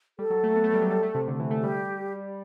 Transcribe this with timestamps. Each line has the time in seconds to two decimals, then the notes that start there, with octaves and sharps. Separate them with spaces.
0.19 G3 A4
0.30 F#3
0.44 A3
0.56 B3
0.64 A3
0.74 G3
0.82 F#3
0.91 G3
1.03 A3
1.15 C3
1.28 D3
1.40 E3
1.51 A3
1.63 G3 G4